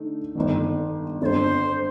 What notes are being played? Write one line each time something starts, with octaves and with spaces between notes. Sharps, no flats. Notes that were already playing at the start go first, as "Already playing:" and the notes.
Already playing: D3 A3 D#4
G1 F2 D#3
G1 F2 D3 C5 D5